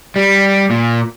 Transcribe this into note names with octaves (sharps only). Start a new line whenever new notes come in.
G3
A#2